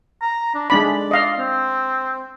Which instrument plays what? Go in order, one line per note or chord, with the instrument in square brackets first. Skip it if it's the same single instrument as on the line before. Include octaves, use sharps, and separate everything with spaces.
[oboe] A#5
D4
[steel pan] G#3 D4 B5 [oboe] D5
[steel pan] D#5 F5
[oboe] C4